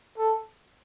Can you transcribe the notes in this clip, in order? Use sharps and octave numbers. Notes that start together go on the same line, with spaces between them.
A4